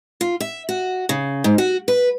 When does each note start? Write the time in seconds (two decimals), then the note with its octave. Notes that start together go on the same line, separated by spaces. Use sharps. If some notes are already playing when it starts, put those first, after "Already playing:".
0.21 F4
0.41 E5
0.69 F#4
1.09 C#3
1.44 G#2
1.58 F#4
1.88 B4